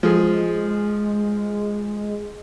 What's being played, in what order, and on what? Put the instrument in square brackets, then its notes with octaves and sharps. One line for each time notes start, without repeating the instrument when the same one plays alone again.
[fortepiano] F3 G#4 [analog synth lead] G#3